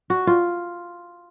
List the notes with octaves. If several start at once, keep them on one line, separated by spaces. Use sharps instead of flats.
F#4
F4